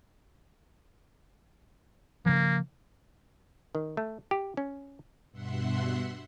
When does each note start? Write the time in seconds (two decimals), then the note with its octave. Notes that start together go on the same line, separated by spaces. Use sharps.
2.26 C#3 F3 A#3
3.75 D#3
3.97 A3
4.31 G4
4.57 C#4
5.32 G2 B2 E5 F#5 C6